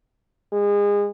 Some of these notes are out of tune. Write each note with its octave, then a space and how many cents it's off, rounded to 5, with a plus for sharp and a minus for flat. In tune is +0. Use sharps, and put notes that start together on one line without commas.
G#3 -30